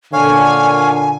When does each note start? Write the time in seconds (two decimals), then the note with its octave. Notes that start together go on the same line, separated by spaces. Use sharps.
0.13 A#2 D3 C#5 F5 G#5